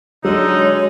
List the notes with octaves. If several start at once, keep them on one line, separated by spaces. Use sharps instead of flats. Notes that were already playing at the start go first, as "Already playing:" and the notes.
D3 F#3 G#3 D#4 C#5